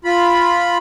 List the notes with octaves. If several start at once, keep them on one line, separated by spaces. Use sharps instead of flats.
F4 B5